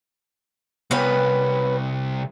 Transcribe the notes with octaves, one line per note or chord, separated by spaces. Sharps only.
C2 B3 C#4 B4